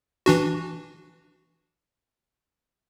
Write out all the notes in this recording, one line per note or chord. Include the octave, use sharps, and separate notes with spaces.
E3 D4 F#4